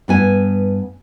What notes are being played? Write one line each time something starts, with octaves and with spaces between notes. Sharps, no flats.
G2 B3 G#5